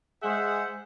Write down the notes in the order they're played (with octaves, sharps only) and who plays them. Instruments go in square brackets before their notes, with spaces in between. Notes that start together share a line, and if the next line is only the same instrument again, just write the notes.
[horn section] G#3 G#4 C5 E5 F#5